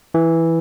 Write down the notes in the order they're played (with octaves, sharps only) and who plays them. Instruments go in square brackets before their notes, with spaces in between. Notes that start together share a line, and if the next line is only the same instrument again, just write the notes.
[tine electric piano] E3